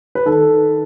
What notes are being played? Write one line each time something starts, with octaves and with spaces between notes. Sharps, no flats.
B4
D#3 A4